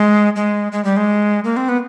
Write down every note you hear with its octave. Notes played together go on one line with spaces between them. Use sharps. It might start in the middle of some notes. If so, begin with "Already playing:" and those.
Already playing: G#3
G#3
G#3
G3
G#3
A#3
C4
B3